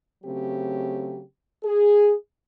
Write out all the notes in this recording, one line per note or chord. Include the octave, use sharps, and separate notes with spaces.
C#3 F#3 A3 C4 G4
G#4